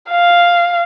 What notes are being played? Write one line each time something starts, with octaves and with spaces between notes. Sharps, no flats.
F5